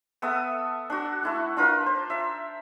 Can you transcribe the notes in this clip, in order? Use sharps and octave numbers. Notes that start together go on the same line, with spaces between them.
B3 A4 E5 D#6
D4 F#4
A3 E4 A4
D4 F4 A#4 B4
C5
E5